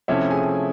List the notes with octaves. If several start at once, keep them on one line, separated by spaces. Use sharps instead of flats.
C3 F3 A3 C#4 E4 E5
G#4 G#5